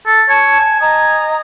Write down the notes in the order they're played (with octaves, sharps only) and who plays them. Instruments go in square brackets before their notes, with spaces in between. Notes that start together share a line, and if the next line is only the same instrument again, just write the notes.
[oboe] A4
[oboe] C#5 [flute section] A5
[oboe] G#5
[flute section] D#5 A#5 D#6